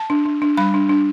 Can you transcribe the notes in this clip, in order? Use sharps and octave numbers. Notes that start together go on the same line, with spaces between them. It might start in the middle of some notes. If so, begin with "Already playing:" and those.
Already playing: A5
D4
D4
D4
G3 B5
D4
D4